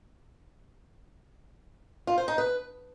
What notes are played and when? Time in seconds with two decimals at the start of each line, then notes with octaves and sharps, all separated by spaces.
2.07 F4
2.18 C5
2.28 D#4
2.38 B4